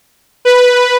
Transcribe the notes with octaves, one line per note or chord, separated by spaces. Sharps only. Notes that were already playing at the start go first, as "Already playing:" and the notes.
B4